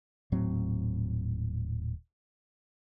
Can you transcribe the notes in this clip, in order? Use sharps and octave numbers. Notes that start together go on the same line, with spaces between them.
D#1 A2 F#3 C4